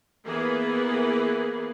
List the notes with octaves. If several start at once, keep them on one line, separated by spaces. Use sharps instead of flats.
E3 A#3 B3 G#4 B4